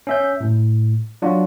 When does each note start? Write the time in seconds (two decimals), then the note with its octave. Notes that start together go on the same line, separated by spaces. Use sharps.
0.07 C#4 E5 G6
0.40 A2
1.22 F#3 D4 F4 F#4